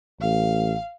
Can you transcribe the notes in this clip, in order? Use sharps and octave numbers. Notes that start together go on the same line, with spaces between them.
A1 F5